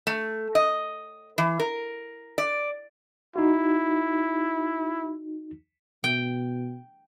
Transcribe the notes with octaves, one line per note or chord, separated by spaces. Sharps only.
A3
D#5
E3
A#4
D5
D#4 E4 F#4
B2 G5